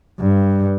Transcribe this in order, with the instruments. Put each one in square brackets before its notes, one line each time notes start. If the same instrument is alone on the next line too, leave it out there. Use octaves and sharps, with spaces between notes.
[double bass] G2